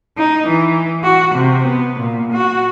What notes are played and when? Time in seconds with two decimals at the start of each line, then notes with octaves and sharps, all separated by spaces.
0.18 D#4
0.48 E3
1.04 F#4
1.36 C3
1.67 B3
2.01 A#2
2.33 F#4